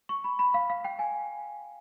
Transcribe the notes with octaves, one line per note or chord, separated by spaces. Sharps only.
C#6
B5
B5
F5
F5
G5
G#5